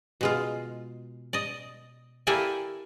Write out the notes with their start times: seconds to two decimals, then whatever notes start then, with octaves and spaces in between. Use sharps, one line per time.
0.21 B2 G#3 F4
1.33 D5 D#5
2.27 A#3 E4 G4 A4 D5 G#5